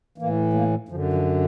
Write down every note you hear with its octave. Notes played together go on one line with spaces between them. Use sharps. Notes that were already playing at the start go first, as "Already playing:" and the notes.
A2 E3 A#3
A#3
F#2 D3 F3
F3